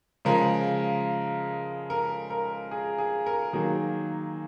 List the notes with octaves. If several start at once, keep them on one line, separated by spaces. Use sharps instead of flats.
C#3 F3 G#3 A#4
A#4
A#4
G#4
G#4
A#4
D#3 F#3 A#3 G#4